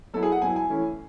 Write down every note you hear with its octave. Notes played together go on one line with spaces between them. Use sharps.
F#3 B3 E4 A4
G#4
F#5
F#3 B3 E4 G#5
G#5
E3 A3 C#4 E4